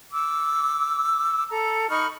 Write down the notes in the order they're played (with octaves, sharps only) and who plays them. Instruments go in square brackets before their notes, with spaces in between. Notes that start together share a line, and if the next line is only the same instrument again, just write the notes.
[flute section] D6 E6
A4 A#5
D#4 B5 C#6 F6